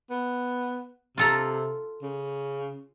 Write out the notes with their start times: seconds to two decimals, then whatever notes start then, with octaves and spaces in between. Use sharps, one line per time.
0.10 B3
1.17 C3 F4 A4 A#5
2.03 C#3